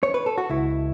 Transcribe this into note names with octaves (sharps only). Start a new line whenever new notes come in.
C#5
B4
A4
F#4
C#2 E4